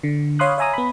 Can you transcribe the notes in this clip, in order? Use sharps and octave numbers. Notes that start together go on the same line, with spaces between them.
D3
C#5 F5 B5 C6 D#6 F#6
C#5 E5 G#5 A#5 D#6
B3 B5